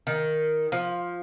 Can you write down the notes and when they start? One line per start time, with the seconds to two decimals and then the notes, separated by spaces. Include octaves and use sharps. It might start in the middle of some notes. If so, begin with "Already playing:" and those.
0.07 D#3
0.72 F3